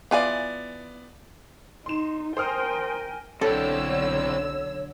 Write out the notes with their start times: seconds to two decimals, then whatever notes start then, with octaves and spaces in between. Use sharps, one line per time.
0.11 E3 B3 F4 D5 G#5
1.86 D#4 C6 E7
2.37 A#4 C5 G5 G#5 D#6 F6
3.41 B1 D3 C4 E4 A4 C#5 G5 E6